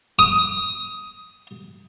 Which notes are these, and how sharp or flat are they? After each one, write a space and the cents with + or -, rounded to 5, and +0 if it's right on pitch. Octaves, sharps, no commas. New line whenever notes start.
D#6 +15